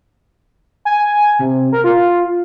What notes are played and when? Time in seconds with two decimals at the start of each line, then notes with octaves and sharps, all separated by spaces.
0.85 G#5
1.39 C3
1.72 A#4
1.84 F4